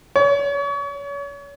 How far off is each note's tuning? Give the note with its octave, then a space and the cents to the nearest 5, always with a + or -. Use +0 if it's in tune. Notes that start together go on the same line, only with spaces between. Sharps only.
C#5 +35